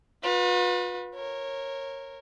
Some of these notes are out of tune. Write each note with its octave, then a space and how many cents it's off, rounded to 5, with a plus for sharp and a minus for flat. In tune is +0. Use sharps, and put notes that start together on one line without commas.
F4 +45 B4 -15
A#4 -5 C#5 -20